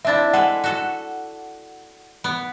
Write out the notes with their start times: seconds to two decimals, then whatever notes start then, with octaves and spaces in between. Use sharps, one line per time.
0.05 C4 D4 E4 E5 A6
0.33 G#3 A4 B4 F#5
0.64 F#4 A4
2.24 B3